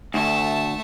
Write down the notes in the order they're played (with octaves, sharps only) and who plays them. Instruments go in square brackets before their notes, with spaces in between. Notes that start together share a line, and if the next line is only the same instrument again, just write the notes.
[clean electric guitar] D2 [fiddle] A3 A5